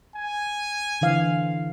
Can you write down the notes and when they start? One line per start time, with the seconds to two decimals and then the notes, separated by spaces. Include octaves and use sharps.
0.16 G#5
1.01 D3 E3 F5